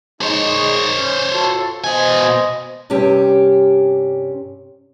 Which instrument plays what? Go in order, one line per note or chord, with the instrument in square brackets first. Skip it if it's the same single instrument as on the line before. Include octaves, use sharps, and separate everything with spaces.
[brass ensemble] G#3 D#4 [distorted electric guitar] C5 C#5
[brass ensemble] C#4
F4 F#4 A4
[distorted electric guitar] B2 G#5 [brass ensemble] C5 D#5
[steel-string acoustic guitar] G2 C3 C#4 G4